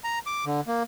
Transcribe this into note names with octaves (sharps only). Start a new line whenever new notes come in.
A#5
D6
D3
A#3